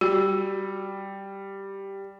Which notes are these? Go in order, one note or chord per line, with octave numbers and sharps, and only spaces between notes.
G3 F#4